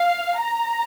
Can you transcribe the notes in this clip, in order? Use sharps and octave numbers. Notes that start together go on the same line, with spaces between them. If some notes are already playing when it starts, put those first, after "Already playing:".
Already playing: F5
A#5